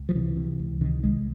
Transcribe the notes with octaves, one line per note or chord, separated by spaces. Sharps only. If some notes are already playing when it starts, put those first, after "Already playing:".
Already playing: C#2
F3
C3 E3
C3
C#2
C3 D#3
C2 G#3